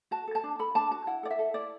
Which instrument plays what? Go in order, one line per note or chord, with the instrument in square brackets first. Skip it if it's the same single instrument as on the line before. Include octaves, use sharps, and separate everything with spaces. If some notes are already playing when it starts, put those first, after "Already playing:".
[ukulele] F#4 A5
A4
A5
D4
A4 B5
D4 A5
F#4 A5
E4 F#5
A4 D5
E5
A4
E4 D5